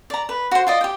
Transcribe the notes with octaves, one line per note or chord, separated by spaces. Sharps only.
D5 A#5
B4
F#4 C5
F4 D5 D#5
G4 G5